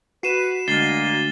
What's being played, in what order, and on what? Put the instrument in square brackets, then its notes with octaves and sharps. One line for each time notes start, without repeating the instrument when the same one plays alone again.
[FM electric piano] F#4 [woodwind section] B4 [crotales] C7 D#7 E7
[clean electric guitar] D2 [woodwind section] G#3 A#3 [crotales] A6 C7 G7